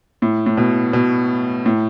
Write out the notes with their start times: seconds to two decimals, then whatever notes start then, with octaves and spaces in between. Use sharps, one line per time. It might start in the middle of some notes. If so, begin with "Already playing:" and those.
0.22 A2
0.46 A2
0.57 B2
0.93 B2
1.66 A2